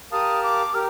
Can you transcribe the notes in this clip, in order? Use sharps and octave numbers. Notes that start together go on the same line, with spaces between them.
G4 A#4 F5 A5 D#6
D6
G4 A#4 F6